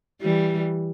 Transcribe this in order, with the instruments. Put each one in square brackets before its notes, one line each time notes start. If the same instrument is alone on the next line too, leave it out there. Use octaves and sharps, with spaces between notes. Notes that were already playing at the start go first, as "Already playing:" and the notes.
[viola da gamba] E3 G3